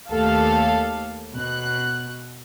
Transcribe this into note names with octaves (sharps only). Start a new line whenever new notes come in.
D#2 A3 G4 A4 F5
B2 F#6